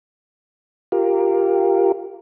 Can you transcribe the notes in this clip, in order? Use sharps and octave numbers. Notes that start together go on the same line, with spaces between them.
F4 G4 A#4